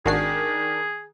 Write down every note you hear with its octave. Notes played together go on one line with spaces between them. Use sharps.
G#1 D#3 D4 F#4 G#4 C7